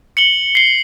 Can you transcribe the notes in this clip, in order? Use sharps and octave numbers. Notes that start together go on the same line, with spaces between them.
C#7 F#7 G7
C7 G7